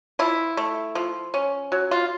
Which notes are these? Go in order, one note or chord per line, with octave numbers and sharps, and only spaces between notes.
F3 E4
A3
F3
C#4
F#3
F4